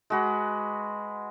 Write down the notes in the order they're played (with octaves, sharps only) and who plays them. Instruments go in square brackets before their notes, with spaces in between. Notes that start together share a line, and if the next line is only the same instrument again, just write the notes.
[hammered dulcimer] G#3 F#4 B4